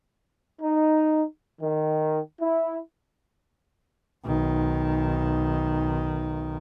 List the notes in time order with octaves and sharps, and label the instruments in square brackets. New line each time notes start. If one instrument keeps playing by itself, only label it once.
[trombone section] D#4
D#3
E4
[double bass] B1 D#3